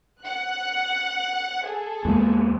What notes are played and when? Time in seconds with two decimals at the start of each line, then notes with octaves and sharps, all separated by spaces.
0.22 F#5 F#6
1.66 G#4 A4
2.05 E2 G#3 A#3